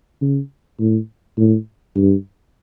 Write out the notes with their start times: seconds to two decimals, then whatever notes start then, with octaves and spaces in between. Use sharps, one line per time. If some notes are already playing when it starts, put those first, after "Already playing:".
0.21 C#3
0.80 A2
1.38 A2
1.96 G2